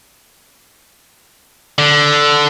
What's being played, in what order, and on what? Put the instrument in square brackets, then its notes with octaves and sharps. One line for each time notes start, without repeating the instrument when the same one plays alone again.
[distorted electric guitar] D3